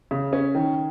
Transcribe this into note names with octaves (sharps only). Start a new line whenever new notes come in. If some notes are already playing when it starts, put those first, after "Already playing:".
C#3
C#4
D#3